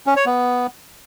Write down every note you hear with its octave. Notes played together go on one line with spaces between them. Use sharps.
C#4
C#5
B3